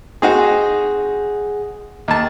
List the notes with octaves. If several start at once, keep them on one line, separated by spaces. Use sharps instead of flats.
C4 D#4 F#4 G#4 F#5
D#2 A5